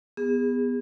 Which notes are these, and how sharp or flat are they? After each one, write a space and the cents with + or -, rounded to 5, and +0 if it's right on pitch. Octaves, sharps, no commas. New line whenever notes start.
B3 +0 G#4 -35